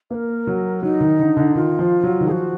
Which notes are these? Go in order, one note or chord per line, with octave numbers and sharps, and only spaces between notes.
A#3 A#4 B4
F#3
F#3 D#4
D#3
D3
D3
D#3 F4
F3
F#3
D#3
F3 F#4 G#4